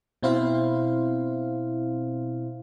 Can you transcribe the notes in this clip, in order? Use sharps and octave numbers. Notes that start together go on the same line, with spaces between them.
B2 C4 E4 C5 F5